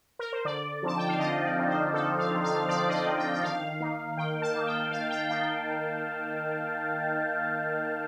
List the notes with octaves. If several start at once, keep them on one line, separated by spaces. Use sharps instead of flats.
A#4
C5
D3 D5
F3 C4 D#4 A5
G5
F5
D3 D#5
D5
F3 C4 D#4
C5
D3 A4
F5
F3 C4 D#4
F5
D3 D5
D#5
D5
F3 C4 D#4
G5
G5
D#3 F5
A#3 D#4
D#3 G5
A5
A#3 D#4
G5
D#3 F5
G5
A#3 D#4 G5